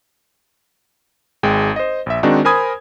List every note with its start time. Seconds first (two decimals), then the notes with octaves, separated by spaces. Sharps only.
1.43 G#1 G#3 G5
1.76 C5 D#5
2.06 A#1 E5
2.23 D#3 G#3 C4 D4 D#4 F#4
2.45 A#4 C5 G#5 B5 D#6 G#6